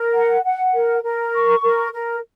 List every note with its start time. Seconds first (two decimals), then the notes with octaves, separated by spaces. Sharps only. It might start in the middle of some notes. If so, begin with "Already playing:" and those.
Already playing: A#4
0.15 F#5
0.45 F#5
0.74 A#4
1.04 A#4
1.34 C#6
1.63 A#4
1.93 A#4